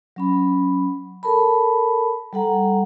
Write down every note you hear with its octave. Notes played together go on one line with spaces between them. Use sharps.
F#3 C#4 B5
A4 A#4 A5 B5
G3 A4 F#5 A#5